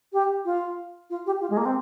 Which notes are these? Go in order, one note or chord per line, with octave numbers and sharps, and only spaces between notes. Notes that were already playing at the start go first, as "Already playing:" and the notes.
G4
F4
F4
G4
F4
G#3
A#3
C4